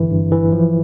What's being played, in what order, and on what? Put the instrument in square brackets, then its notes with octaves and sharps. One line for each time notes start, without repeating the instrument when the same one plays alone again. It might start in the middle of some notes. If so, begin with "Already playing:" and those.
Already playing: [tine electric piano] G1 E3
G2
E3
F3